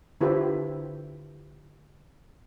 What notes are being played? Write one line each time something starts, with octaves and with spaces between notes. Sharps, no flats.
D3 E4 F4 G4 B4 C5